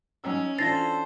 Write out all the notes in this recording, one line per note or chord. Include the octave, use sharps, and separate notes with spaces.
F#3 C#4 D#4 E6
E3 D4 F4 A4 C5 A6 A#6 C7